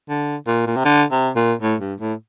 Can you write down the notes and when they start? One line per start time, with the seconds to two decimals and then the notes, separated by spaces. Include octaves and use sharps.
0.09 D3
0.47 A#2
0.67 A#2
0.77 C3
0.85 D3
1.12 C3
1.36 A#2
1.62 A2
1.80 G2
2.00 A2